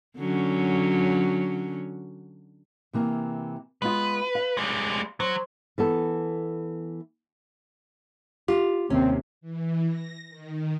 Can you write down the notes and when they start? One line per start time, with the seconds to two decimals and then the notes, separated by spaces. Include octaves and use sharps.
0.18 D3 F#3 C#4
2.93 C3 E3 A#3
3.82 G#3 B3 F4 B4
4.35 F5
4.57 G3 G#3
5.20 F#3 C5
5.78 E3 B3 A4
8.48 F4 G4
8.90 D#2 C3 C4 C#4
9.41 E3
9.88 A#6
10.29 D#3